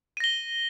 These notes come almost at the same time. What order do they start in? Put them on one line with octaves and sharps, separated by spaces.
D#7 A#6 G7